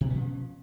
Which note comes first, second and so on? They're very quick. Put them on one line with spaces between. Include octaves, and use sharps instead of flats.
B2 B3 C#4 F3